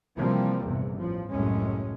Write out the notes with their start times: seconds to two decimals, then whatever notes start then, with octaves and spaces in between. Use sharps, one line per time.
0.16 C3 E3 F3 G3 A#3 C4
0.63 A#1 E2 G2 C3
0.93 A1 F3
1.30 C2 F#2 A2 G#3 C#4